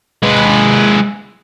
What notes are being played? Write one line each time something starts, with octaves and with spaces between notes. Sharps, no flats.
G#3 B4